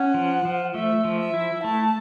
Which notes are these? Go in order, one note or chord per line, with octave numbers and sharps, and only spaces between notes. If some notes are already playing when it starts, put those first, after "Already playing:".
Already playing: C#4 F#5
F3
F3
A3 E5
F3
E5
E4
A3 A5